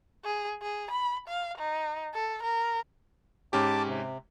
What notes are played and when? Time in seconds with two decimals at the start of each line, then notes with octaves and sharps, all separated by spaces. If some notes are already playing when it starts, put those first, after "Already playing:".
0.24 G#4
0.62 G#4
0.91 B5
1.28 F5
1.58 D#4
2.14 A4
2.43 A#4
3.53 G#2 C#4 G4 A5 D6
3.88 C3